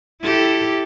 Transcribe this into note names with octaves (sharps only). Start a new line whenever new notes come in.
E4 G4 A4